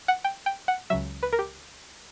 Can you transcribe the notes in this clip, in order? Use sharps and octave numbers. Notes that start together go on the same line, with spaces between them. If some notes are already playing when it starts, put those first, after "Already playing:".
F#5
G5
G5
F#5
C#2 C#3 F#3 E5
B4
A#4
G4